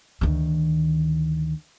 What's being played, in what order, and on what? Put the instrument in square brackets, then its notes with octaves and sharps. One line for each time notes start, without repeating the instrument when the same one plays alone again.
[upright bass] D2 D#3